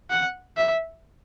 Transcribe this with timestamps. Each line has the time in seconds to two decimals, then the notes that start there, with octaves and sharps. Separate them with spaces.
0.10 F#5
0.57 E5